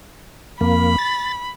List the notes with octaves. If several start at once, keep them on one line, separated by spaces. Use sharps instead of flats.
F2 A#3 B5
A6